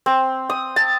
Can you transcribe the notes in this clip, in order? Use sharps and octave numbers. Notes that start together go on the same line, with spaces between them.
C4
D#6
A5